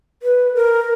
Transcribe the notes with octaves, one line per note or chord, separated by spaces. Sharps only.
B4
A#4